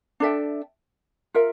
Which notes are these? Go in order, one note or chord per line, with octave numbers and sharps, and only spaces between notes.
D4 A4 E5 G5
F4 A#4 E5